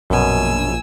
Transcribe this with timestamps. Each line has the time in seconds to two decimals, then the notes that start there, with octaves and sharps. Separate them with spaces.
0.10 A#1 F#2 B2 G#5 E6